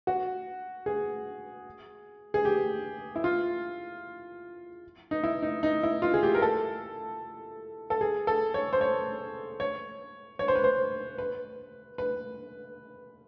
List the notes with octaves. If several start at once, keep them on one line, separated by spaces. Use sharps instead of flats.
F#4
G#4
G#4
G4
E4
F4
D#4
E4
D#4
D#4
E4
F4
G#4
G4
A#4
A4
A4
G#4
A4
C#5
C5
C#5
C#5
C#5
C5
B4
C5
B4
B4